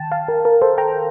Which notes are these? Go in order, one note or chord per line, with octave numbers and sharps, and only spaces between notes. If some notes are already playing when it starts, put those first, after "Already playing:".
Already playing: D#3 G5 A5
F5 A5
A#4
A#4
A4 C5
G5 A#5